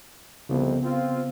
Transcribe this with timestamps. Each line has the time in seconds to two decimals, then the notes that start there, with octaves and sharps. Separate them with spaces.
0.49 C2 F2 C#3 B3
0.83 C4 F4